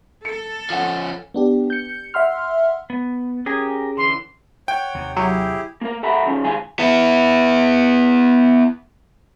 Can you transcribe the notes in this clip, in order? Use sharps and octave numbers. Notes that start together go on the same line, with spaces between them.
A4 C#7
F3 C#4 F5 F#5
B3 D4 G4
G6 C#7
E5 F#5 C6 F6
B3
C#4 G4 G#4 A#4 G#5
D3 E3 C6
C#5 F#5 G5
D#2 C3
F#3 E4 G4 G#4
A#3 A#4
A4 E5 F#5 A#5 B5
C#3 F3 C#4
D#3 F3 G#3 G#4 F5 G#5
B3 E4